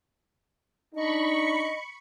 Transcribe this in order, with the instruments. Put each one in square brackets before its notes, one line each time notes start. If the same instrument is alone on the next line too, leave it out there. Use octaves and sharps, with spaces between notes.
[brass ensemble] D4 D#4 [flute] D#5 [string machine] B5 C#6 C#7